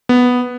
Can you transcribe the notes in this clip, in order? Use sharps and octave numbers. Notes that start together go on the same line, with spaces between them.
B3